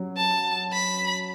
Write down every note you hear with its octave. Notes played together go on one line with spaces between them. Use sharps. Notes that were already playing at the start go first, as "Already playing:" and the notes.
Already playing: F#3 C#4
A5
B5